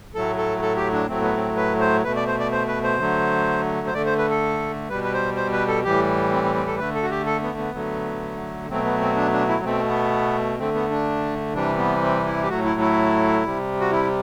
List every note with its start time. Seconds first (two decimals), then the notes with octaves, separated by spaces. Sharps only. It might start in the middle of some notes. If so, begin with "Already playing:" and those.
0.14 A2 F#3 A3 A4
0.38 A4
0.62 A4
0.77 G4
0.93 D4
1.08 A2 F#3 A3 C4
1.21 B3
1.35 C4
1.57 B4
1.80 C5
2.04 B2 A3 B4
2.16 D5
2.28 C5
2.39 D5
2.52 C5
2.68 B4
2.84 C5
3.00 D3 F#3 A3
3.87 C5
3.94 D3 A3 D5
4.06 C5
4.18 B4
4.30 A4
4.89 B2 G3 B4
5.04 B4
5.13 C5
5.36 C5
5.53 B4
5.68 A4
5.84 A2 E3 G3 G4
6.32 C4
6.44 C4
6.55 C4
6.67 A4
6.79 D3 A3 B4
6.95 A4
7.03 F#4
7.11 G4
7.26 A4
7.43 B3
7.58 B3
7.74 D3 F#3 A3
8.70 B2 F#3 A3 C4
8.85 B3
9.01 C4
9.16 D4
9.32 D4
9.48 E4
9.64 B2 A3 C4
9.87 B3
10.59 D3 A3 C4
10.75 B3
10.90 D4
11.53 C3 E3 G3 D4
11.78 B3
12.02 C4
12.26 E4
12.43 G4
12.49 A2 F#3 A3 F#4
12.65 E4
12.80 E4
13.44 C3 G3
13.81 F#4
13.91 E4